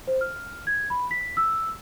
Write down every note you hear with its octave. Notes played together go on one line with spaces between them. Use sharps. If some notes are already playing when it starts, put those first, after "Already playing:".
C5
F6
G#6
B5
B6
E6